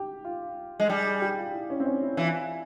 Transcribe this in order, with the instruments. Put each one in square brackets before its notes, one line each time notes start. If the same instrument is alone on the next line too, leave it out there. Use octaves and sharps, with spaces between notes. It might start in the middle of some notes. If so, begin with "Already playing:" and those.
Already playing: [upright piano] G4
F4
[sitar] G#3
[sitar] G3 [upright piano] G#4
[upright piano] G#4
G4
F4
E4
C#4
C4
C#4
E4
[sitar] E3 [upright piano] F4